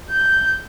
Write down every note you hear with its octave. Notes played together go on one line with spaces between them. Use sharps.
G6